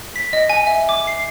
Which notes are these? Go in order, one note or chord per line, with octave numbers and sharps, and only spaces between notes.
B6
D#5
G#5
E5
D6
C7